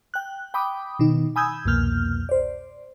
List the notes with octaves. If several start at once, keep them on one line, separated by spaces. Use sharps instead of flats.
G5 F#6
G5 B5 D6 D#6
B2 D#3 D#4
G#5 B5 D#6 E6 G6 G#6
C2 F2 B2 A#3 F6 G6
C5 D5